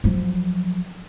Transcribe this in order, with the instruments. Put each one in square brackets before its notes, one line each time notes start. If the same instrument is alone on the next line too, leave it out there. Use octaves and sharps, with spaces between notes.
[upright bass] F3 F#3